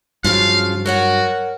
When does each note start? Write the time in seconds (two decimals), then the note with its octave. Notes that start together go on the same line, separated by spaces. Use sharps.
0.24 G2 C#3 F3 F#3 F5
0.86 F#4 A#4 C#5 F#5